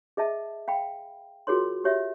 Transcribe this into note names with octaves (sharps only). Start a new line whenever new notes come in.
G#4 D#5 E5 A5
F5 G5 B5
F4 F#4 G#4 A#4 C#5 C6
G4 C#5 E5